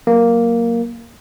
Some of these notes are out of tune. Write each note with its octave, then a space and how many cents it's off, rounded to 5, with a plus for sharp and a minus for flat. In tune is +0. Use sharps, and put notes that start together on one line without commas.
F#3 +10 A#3 +0